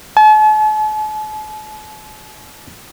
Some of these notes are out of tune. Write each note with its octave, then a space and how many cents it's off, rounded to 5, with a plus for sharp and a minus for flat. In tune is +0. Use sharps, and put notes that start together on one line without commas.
A5 -45